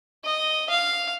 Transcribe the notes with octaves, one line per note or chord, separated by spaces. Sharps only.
D#5
F5